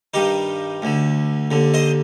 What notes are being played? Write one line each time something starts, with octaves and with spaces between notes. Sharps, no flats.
G2 D#3 D#4 G4
D2 D3
D#2 D3
C5 D#5